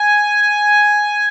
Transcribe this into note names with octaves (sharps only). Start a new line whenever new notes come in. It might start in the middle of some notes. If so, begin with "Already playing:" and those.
Already playing: G#5